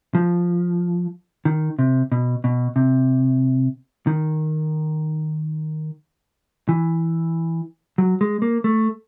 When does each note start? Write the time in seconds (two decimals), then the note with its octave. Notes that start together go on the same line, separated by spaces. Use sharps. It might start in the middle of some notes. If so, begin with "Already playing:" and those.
0.15 F3
1.45 D#3
1.79 C3
2.12 B2
2.44 B2
2.76 C3
4.07 D#3
6.69 E3
7.98 F#3
8.21 G#3
8.42 A#3
8.64 A3